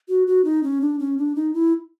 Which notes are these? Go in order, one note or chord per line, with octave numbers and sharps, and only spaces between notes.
F#4
F#4
D#4
C#4
D4
C#4
D4
D#4
E4